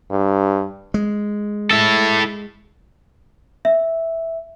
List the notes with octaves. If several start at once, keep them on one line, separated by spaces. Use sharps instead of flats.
G2
G#3
E4 A4
E5